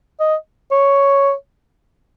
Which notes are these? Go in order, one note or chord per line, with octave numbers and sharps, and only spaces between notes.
D#5
C#5